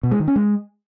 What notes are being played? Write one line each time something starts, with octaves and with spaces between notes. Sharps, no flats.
B2
G#3
D#3
C#4
G#3